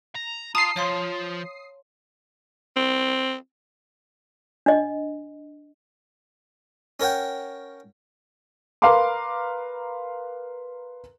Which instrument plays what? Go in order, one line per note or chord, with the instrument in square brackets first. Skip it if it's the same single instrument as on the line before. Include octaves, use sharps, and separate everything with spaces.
[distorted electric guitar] A#5
[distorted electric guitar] F4 [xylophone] A5 A#5 [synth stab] D#6 C7
[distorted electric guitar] F3 [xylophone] C#5 F5 C6
[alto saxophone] C4
[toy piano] D4 D#5
[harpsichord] C#4 A#4 C#5 F#5 G5
[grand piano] A#4 B4 F5 A#5 C6 D6